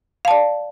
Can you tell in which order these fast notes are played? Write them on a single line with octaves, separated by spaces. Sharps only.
F5 A5 D5